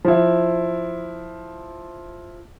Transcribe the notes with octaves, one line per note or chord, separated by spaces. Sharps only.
F3 E4